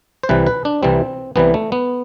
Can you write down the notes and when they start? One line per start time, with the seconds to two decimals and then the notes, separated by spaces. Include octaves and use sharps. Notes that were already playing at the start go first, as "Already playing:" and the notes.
0.23 C5
0.29 C2 C3 E3 G3 B4
0.47 B4
0.65 D4
0.83 C2 C3 E3 G3 C4
1.36 C2 C3 E3 G3 B3
1.54 A3
1.72 B3